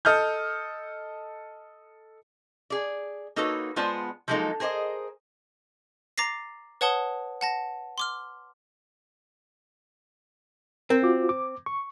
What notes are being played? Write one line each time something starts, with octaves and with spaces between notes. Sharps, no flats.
A4 D#5 F6 G6
G#4 D5
A#3 D#4 F#4 A4 B4 C#5
G#3 B3 F4 C5 D5 A5
F3 F#3 G#3 A#3 D#4 A4
G#4 A#4 C5 D5 D#5
A#5 D6 A6 A#6 C7
B4 C#5 F#5 A5 D#6 G7
F#5 A5 A#6
C6 D6 F6
C4 A#4
F4 F#4 D6
D6
C#6